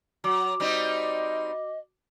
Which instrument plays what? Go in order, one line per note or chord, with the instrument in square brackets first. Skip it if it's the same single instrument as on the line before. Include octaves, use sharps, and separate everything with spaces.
[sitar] F#3 [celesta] F#4 D6
[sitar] G3 C4 D#4 [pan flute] D#5